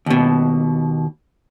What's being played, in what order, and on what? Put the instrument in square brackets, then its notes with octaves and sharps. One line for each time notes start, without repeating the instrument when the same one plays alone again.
[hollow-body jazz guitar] D#2 B2